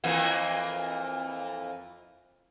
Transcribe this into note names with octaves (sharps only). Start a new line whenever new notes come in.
F2 E3 A#3